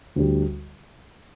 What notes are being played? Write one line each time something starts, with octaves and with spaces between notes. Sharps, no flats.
D2 D3 G3